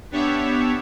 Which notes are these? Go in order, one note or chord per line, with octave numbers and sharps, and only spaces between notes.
B3 D4 G4 C#5 E5